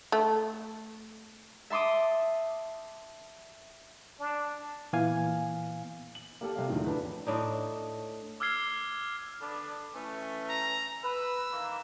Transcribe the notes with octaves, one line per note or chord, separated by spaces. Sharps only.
A3
E5 A5 C6 D6 D#6
D4
A#2 E3 B3 F5 G#5
F#7
A#3 G4 A4
C3 G3 F5
E2 A2 D3 D#3 F3 F#3
D4 B4
A2 D4 D#4
D6 E6 F6 G#6 C7 G7
D3 B3 D4
E3 A3 C#4
A#5
B4 E6
D#3 E3 A#3